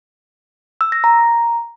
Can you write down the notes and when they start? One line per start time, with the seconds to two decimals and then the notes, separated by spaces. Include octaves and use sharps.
0.81 E6
0.92 A#6
1.04 A#5